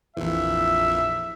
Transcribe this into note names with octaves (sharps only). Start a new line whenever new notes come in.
A#1 F2 E3 E5